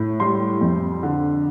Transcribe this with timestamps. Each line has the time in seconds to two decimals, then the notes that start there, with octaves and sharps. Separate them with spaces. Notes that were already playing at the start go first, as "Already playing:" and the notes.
Already playing: A2
0.20 G3 C6
0.61 F2
1.03 D3